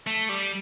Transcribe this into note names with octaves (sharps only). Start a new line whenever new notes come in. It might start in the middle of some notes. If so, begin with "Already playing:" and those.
A3
G3